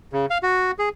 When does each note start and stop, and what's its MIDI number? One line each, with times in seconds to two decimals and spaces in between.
0.13 0.26 49
0.30 0.38 77
0.43 0.71 66
0.79 0.89 68